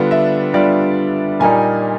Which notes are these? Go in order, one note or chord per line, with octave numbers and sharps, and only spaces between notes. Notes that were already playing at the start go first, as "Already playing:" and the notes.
Already playing: D3 G3 B3 D4 F4
E5
D3 G3 B3 D4 F4 D5
A#2 G3 A#3 D#4 G#5